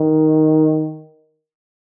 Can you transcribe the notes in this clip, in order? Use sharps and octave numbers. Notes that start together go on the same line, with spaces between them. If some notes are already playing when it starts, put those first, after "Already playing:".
Already playing: D#3